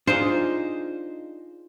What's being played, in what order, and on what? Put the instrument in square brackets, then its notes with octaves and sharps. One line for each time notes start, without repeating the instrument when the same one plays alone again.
[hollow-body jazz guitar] D4 D#4 G#4 [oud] F4 [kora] C5